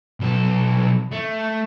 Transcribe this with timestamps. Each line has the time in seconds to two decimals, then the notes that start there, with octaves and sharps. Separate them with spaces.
0.20 B1 A4
1.12 A3